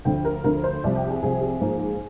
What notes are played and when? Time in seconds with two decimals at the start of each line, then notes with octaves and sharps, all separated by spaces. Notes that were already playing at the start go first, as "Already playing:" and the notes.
0.05 D2 D3 F3 G5
0.25 A#4
0.44 D2 D3 F3 A#4
0.64 C5
0.84 C2 C3 F3 D5
0.96 G5
1.04 G4
1.09 G#4
1.23 C2 C3 F3 G#4
1.42 G#4
1.61 G#2 F3 A#3